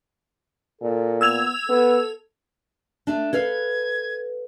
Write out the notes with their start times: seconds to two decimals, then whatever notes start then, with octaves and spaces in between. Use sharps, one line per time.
0.81 A#2 A4
1.21 B3 E6 G#6 F7
1.69 B3 A4
3.07 A3 D4
3.33 A4 B4 F5 G#6